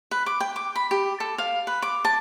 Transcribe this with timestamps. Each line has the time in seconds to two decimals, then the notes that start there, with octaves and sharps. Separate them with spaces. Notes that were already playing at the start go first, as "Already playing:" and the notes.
0.11 B4
0.26 D6
0.40 G5
0.56 D6
0.76 B5
0.91 G4
1.20 A4
1.38 F5
1.67 B4
1.82 D6
2.04 A5